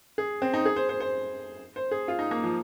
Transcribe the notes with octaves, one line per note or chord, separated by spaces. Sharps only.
G#4
C4
D#4
G#4
C5
C5
C5
C5
G#4
F4
D#4
A#3
F3